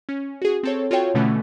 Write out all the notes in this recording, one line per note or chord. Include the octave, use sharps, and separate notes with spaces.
C#4
F#4 G#4
C4 A4 C#5
F4 F#4 A4 C#5 G5
B2 D3 E3 A3 C#4